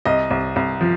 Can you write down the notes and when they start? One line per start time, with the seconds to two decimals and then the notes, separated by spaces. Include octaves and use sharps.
0.05 C2 D#5
0.31 C2
0.56 C2
0.81 F3